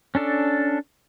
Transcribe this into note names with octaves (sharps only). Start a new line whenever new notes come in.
C#4 D4 A4 D5